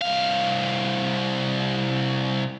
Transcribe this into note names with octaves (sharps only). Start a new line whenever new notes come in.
C2 F5